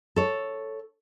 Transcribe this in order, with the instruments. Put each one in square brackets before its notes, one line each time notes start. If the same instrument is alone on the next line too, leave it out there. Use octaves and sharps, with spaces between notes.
[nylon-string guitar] A4 C#5